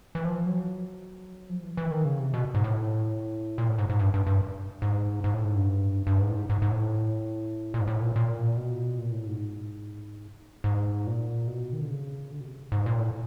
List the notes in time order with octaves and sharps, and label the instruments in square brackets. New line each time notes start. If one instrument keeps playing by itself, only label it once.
[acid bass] E3
F3
F#3
F3
E3
E3
D#3
C#3
C3
B2
G#2
A2
A#2
A2
G#2
G#2
G2
G2
G2
G#2
G#2
A2
G#2
G2
G2
G#2
A2
G#2
G#2
G#2
A2
A#2
G#2
A2
A#2
A#2
B2
A#2
A2
G#2
G#2
A#2
B2
D#3
D3
C#3
D3
B2
C3
G#2
A#2
A2